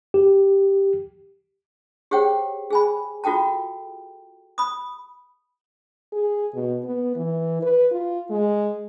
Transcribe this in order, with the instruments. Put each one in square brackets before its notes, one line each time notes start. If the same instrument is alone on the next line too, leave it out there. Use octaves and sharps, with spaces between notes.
[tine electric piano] G4
[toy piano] G4 G#4 C5 C#5 F#5 G5
G#4 G#5 B5
F4 F#4 A4 G5 A5
B5 D#6
[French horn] G#4
B2
B3
E3
B4
F4
G#3